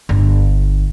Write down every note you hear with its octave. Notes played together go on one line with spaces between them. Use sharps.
G1